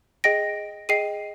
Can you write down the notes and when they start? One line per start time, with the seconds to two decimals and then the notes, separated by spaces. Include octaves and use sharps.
0.24 G#4 D#5 G5 A#6 D7
0.89 G#4 D#5 G5 C7 D#7